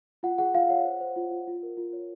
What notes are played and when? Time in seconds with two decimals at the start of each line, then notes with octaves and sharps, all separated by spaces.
0.23 F4 F#5
0.38 G#4 F#5
0.55 F4 F5
0.70 C#5 F#5
0.85 C5
1.01 C5
1.16 F4
1.31 F4
1.47 F4
1.63 A#4
1.77 F4
1.93 C#5